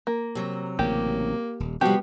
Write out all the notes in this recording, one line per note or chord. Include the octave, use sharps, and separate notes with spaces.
A#3
C3 F#3
A1 C#3 A#3 G4
D#1
C3 F3 G3 B3 F#4 G4